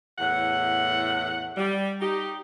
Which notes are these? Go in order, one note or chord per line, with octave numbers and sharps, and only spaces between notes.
E2 A2 F#5
G3
D#4 G4